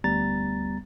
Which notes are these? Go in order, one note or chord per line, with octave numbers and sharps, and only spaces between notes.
D2 G3 B3 A#5 A6